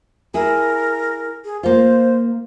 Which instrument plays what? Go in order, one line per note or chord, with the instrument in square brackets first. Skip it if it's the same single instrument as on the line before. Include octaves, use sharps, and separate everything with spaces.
[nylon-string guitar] E4 G#4 [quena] A#4
[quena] G#4
[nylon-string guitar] A#3 F4 [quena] C5